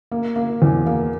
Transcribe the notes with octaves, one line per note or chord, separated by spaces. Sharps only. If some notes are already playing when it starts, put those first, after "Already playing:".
A#3
A#3
E2
A#3